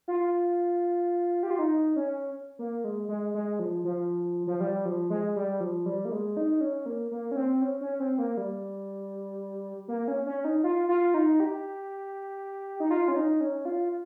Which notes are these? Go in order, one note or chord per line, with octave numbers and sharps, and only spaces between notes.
F4
G4
F4
D#4
C#4
A#3
G#3
G#3
G#3
F3
F3
F3
G3
F3
G#3
G3
F3
G3
A#3
G#3
D#4
C#4
A#3
A#3
C#4
C4
C#4
C#4
C4
A#3
G3
A#3
C#4
C#4
D#4
F4
F4
D#4
G4
D#4
F4
C#4
D#4
C#4
F4